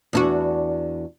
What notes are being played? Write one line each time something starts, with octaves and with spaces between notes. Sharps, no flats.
E2 D4 F#4